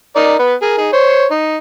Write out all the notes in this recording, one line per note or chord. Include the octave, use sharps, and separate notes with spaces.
D#4 A#4 D5
B3 B4
G#4 A#4
D#4 G#4
C5 C#5
D#4